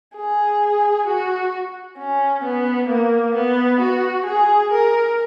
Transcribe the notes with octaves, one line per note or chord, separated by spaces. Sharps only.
G#4
F#4
C#4
B3
A#3
B3
F#4
G#4
A#4